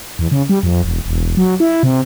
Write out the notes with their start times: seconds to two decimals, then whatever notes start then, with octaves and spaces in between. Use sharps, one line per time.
0.19 E2
0.32 C#3
0.49 G3
0.63 F2
0.84 E1
1.06 E1
1.37 F#3
1.60 E4
1.83 C3